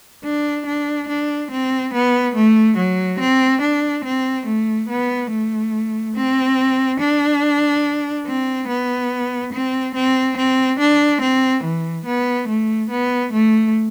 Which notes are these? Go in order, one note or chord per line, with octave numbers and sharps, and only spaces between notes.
D4
D4
D4
C4
B3
A3
F#3
C4
D4
C4
A3
B3
A3
C4
D4
C4
B3
C4
C4
C4
D4
C4
E3
B3
A3
B3
A3